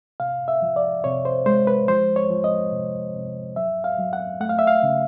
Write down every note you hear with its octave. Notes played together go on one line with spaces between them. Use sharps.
C3 F5
E5
F3
D5
C3 C#5
C5
G#3 C5
B4
F3 C5
C#5
F3
D#5
C3
C3
F#3 E5
F5
F#3
F#5
A3 F#5
F5
E5
F5
C#3